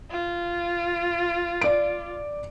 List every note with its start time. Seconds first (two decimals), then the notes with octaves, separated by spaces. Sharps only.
0.11 F4
1.61 D5 D7